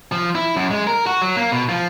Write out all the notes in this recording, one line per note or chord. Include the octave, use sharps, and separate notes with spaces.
F3
E4
F#2
G#3
A#4
F#4
F#3
A#3
B2
F3